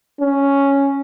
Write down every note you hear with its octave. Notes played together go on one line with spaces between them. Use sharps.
C#4